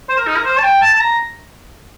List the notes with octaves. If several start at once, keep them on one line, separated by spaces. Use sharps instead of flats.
C5
A#4
D#4
A#4
C5
A5
G5
A5
A5
A#5